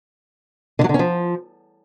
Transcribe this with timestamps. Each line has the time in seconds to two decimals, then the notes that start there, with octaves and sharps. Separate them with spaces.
0.79 D3
0.84 F#3
0.89 D3
0.94 C#4
0.99 F3